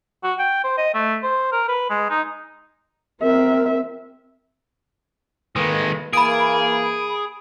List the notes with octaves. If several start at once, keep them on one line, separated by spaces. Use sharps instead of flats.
F#4
G5
C5
D#5
A3
C5
A#4
B4
G#3
D#4
C4 A#4 E5
D#3 G#3 A#3 A4 B4
E3 A#3 G#4 B5 D7